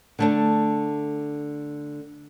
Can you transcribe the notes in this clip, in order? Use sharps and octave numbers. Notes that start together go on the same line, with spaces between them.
D3 A3 D4